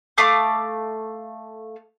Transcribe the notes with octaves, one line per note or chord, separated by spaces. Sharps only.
A3 F5 D6 D#6